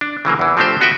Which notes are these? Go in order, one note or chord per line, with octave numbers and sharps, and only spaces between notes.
D4
C#3 E3 F#3 A#3
E2 E3
F3 A3 C4 D4 G4 C5
B3 F#4 B4 E5 G5